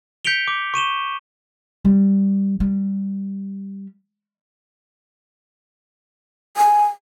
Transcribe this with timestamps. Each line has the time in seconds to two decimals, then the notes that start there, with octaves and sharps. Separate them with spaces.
0.25 G6 B6 C#7 D7 F7 G7
0.48 D6
0.74 C#6 D#7 E7 G7
1.85 G3
2.60 G3
6.57 G#5